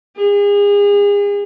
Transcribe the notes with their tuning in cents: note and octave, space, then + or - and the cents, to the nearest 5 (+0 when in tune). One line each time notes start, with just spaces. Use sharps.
G#4 -35